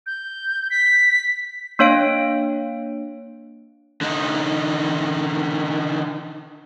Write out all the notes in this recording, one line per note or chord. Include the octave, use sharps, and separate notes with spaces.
G6
B6
A#3 D4 C#5 F5 D7
D3 D#4